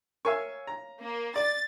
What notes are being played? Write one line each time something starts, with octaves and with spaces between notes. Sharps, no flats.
A#4 C#5 E5 F5 G#5 C#6
A#5
A#3
D5 A6